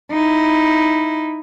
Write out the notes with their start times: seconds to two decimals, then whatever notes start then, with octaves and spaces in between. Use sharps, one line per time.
0.11 D#4 E4